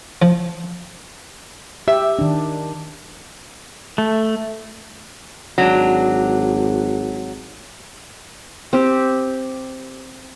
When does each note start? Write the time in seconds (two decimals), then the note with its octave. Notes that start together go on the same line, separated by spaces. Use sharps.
0.22 F3
1.88 G4 E5
2.19 D#3 D4
3.98 A3
5.58 G#1 F#3 D4
8.73 C4 G4